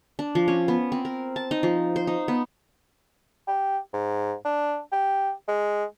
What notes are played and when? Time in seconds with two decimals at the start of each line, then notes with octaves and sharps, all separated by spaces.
0.19 D4
0.35 F3
0.48 C#4
0.68 B3
0.92 C4
1.05 A#4
1.36 A5
1.51 D#4
1.63 F3
1.96 C5
2.07 D#4
2.28 B3
3.48 G4
3.93 G#2
4.45 D4
4.92 G4
5.48 G#3